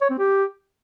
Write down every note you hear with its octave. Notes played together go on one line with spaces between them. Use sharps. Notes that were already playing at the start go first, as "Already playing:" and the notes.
C#5
C4
G4